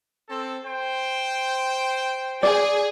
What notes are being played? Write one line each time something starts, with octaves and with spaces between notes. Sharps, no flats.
C4 A4
C5 G5
G#4 D5